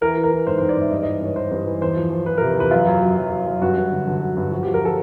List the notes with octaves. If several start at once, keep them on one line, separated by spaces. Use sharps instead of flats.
E3 A#4
E3
A#4
E3
G#2 C5
G#2 C5
D5
G#2 E5
G2 D#5
E3 D#5
G2 C#5
E3 C5
G2
E3
E2 C5
F3
F3
F3 B4
C3 A#4
E2 B4
F#2 F4
F#2
F#3
F#2
F#2
F#2
G2 F#4
G2
D3
D3
F#3
G2
F3 F#4
F3 G4
A#4
F3 A4